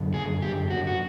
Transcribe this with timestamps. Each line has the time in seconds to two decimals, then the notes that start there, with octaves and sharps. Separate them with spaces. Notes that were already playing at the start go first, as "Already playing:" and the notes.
Already playing: F#2 D3
0.14 G#4
0.42 G4
0.70 F#4
0.87 F#4